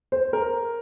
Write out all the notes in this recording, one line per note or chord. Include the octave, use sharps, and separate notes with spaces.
C5
A#4